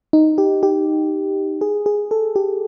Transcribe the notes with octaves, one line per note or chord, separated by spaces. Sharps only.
D#4
G4
G4
G#4
G#4
A4
G4